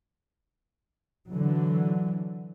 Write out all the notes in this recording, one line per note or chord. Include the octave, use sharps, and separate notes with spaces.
D3 E3 F#3